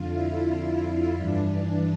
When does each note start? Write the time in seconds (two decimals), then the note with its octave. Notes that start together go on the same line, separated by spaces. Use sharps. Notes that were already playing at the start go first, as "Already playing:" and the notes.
Already playing: F2 D3 F4
0.11 E4
0.47 E4
1.17 G2 E3 D4